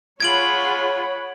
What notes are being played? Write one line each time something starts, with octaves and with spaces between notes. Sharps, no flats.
F4 G#4 C#5 F#5 B5 G#6 D7 F#7